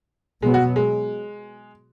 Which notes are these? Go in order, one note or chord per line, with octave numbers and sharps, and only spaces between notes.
B2 F#3 G#3 B3
F#4
G#3